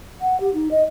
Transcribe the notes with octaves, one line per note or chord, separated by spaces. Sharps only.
F#5
G4
D#4
D#5